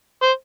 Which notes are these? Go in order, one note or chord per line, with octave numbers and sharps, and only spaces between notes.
C5